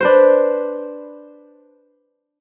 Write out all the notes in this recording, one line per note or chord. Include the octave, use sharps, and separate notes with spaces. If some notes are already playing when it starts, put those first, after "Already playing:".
D4 B4 C5